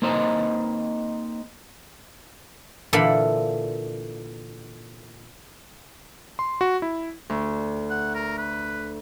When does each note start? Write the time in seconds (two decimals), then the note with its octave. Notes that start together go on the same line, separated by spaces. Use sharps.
0.02 A#3 C4 D#4 C5 D#5
2.93 A#2 D3 E3 A4 F5 B5
6.39 C6
6.61 F#4
6.82 E4
7.30 D2
7.90 F#5
8.15 A#4
8.38 B4